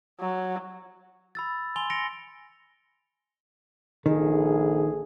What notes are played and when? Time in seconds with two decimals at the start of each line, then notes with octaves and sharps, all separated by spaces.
0.20 F#3
1.35 B5 E6 A6
1.76 G#5 C6 F7 G7
1.90 A#6 C#7 D7 F7
4.06 A#1 D#3 G#4 A4